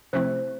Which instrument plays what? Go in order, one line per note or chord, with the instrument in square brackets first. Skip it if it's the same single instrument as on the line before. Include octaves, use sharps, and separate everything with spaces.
[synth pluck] C3 F3 A3 C4 E4 [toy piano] C5